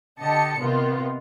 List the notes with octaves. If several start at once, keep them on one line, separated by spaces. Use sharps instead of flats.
D3 G4 D#5 A5 C#7
C3 D#3 B3 F4